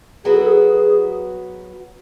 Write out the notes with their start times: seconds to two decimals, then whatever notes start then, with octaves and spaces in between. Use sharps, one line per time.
0.25 F#3 B3 F#4 G#4 B4
0.35 A4
0.46 G#4